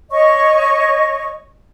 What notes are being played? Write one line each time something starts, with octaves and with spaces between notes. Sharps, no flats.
C#5 D#5 C#6